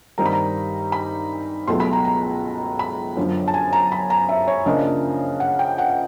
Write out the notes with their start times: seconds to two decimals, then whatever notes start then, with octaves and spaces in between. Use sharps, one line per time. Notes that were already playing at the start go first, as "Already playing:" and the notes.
0.18 G2 D#3 G3 C4 D#4 A#5
0.26 B5
0.33 A#5
0.92 B5
1.67 C#2 B2 F#3 A3 C6
1.80 B5
1.93 A#5
2.05 A#5
2.79 B5
3.17 F#2 D3 F3
3.48 A5
3.54 G#5
3.73 A#5
3.92 B5
4.10 A#5
4.29 E5
4.48 C#5
4.66 C#3 F3 A#3 D4 F4 D#5
5.40 F#5
5.59 G5
5.78 F#5